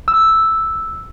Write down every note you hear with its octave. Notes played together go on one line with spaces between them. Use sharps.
E6